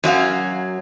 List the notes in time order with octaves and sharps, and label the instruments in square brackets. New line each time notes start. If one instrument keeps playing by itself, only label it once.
[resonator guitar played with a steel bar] F#2 F#3 C#4 F5